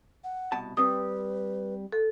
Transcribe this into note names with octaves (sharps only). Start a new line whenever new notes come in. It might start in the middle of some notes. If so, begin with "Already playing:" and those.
F#5
C2 B2 A5
G3 C4 B4 D#6
A4